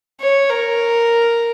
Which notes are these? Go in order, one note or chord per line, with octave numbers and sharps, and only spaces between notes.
C#5
A#4